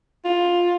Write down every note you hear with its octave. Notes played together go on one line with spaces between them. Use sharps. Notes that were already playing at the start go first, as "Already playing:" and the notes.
F4